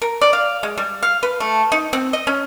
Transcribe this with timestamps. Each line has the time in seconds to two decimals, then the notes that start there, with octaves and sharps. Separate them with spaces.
0.02 A#4
0.21 D5
0.33 F5
0.63 G#3
0.78 G3
1.03 F5
1.23 B4
1.40 A3
1.72 D#4
1.93 C4
2.13 D#5
2.27 C#4